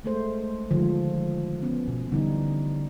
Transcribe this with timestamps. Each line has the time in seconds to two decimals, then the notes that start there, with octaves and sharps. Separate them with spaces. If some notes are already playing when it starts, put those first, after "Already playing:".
0.04 G#3 A3 C5
0.71 D3 D#3 F3 G#3
1.62 B3 C#4
1.88 B2
2.12 D3 E3 G3 D#4